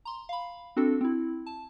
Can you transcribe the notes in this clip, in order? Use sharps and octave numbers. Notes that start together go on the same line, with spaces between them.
A#5 C6
F5 B5
C4 D4 F#4 A4
C4 E4
A5